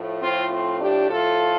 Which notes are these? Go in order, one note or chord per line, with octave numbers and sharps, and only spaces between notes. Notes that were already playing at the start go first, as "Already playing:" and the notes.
Already playing: A2 F3 A3
C4 F4
C4 F4
D4 G4
A2 F3 A3 F4 A4